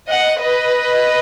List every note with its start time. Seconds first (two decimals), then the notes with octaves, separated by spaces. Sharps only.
0.10 D#5 F#5
0.39 B4 D#5